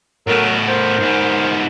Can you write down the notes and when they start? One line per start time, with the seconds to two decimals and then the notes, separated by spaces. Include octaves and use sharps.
0.27 A2 F#3 A3 B3 A#4
0.69 A#4 C5
0.99 G#2 B3